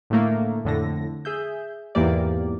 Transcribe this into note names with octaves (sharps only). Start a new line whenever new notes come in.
A2 D3 A3 A#3
F2 A2 D3 A4 A#6
G#4 E5 G6
E2 G#2 E3 A#3 G4 D5